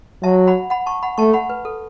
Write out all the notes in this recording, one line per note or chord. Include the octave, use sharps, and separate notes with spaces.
F#3 E5 A5
F#5 B5
F#5 B5
A5 C#6
F#5 B5
A3 A5 C#6
F#5 B5
B4
A4